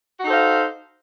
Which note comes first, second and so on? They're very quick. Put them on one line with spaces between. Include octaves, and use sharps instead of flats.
F#4 D#4 A4 C5 F5